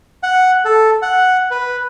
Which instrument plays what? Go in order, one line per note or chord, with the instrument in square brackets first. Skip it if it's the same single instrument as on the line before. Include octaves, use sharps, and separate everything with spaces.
[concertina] F#5
A4
F#5
B4